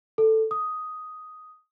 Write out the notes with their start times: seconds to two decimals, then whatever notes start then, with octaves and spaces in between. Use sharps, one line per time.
0.18 A4
0.51 D#6